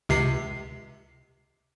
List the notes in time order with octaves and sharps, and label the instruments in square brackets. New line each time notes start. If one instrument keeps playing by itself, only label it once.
[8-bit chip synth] C#2 C3 C7